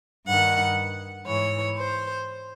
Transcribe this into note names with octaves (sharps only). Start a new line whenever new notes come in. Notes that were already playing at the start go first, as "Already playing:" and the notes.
G2 D#3 F#5
G#2 E3 C#5
C5